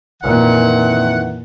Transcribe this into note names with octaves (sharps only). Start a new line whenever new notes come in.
F2 A#2 D#3 E3 F#5